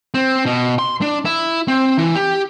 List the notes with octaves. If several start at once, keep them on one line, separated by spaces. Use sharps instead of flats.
C4
B2
C6
D4
E4
C4
E3
G4